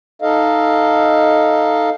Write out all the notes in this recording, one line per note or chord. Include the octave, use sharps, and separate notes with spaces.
D#4 A4 D#5 F5